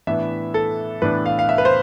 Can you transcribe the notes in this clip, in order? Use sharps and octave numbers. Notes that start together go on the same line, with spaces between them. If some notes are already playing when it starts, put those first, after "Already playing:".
A2 E3 B3 D4 E5
A4
A2 E3 B3 D4 B4
F5
F5
E5
B4
C5